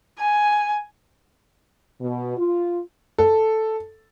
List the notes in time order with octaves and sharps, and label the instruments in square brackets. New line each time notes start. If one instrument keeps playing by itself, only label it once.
[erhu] G#5
[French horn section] B2
F4
[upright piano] A4